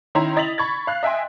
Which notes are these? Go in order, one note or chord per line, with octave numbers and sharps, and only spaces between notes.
D#3 C#4 D#4 E4 A#5 C6
E4 D#5 A6 B6 F7 F#7
B5 C#6 G#6 A6
F5 F#6
D#5 E5 G5 G#5 C6